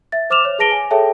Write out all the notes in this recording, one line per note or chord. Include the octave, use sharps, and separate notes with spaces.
E5 A6
C5 D6 F6 E7 F7
C#5
G#4 B4 A5 A#6 D7 G7
G#5
G#4 A4 C#5 E5 G5 A5